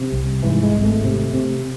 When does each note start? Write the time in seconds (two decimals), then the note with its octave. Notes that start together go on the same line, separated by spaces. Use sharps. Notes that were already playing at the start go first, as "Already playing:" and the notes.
Already playing: C3
0.12 C2
0.43 G#2 E3
0.63 G#3
0.73 G#1
0.83 A3
1.04 C3
1.34 C3